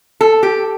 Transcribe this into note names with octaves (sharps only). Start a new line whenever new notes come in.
A4
G4